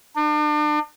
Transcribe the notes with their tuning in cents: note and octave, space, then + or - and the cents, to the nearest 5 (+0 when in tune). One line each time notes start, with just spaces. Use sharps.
D4 +40